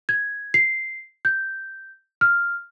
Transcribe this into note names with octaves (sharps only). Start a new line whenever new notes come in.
G#6
C7
G6
F6